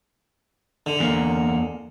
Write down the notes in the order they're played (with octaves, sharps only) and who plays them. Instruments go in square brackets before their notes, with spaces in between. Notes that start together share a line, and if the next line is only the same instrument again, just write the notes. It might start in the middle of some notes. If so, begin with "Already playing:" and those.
[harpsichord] D3
[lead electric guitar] E2 A#3